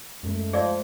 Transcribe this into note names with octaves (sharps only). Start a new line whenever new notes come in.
F#2 G#3 A3
F3 G#4 D5